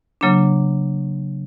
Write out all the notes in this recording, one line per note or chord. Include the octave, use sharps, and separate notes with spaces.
C#3 F#3 A#3 D4